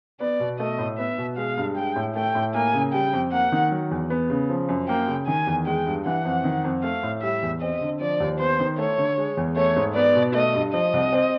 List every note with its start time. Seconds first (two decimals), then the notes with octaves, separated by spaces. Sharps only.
0.20 B3 D5
0.40 B2
0.59 A3 D#5
0.78 A2
0.98 B3 E5
1.18 B2
1.37 G#3 F5
1.57 G2
1.76 G#3 G5
1.96 A2
2.16 A3 G5
2.35 A2
2.55 A#3 G#5
2.74 C#3
2.93 G3 G5
3.13 F2
3.32 A#3 F#5
3.52 D#3
3.71 F#3
3.91 E2
4.10 B3
4.30 C#3
4.49 F3
4.69 F#2
4.88 A#3 G5
5.08 C#3
5.28 D#3 G#5
5.47 E2
5.66 G#3 G5
5.86 G2
6.06 E3 F#5
6.25 F2
6.44 D#3
6.64 F2
6.83 A3 F5
7.03 A2
7.23 G3 E5
7.42 E2
7.61 C4 D#5
7.81 D3
8.01 F3 D5
8.20 D#2
8.39 B3 C5
8.59 D#3
8.78 A3 C#5
8.98 D3
9.18 G#3
9.37 E2
9.56 A3 C#5
9.76 G#2
9.95 B3 D5
10.15 B2
10.34 A3 D#5
10.54 G2
10.73 F3 D#5
10.93 C2
11.12 C4